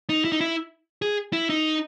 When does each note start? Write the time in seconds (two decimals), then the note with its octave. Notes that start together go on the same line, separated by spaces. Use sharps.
0.10 D#4
0.25 E4
0.32 D#4
0.41 E4
1.02 G#4
1.33 E4
1.50 D#4